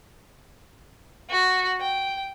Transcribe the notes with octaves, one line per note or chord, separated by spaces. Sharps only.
F#4
G5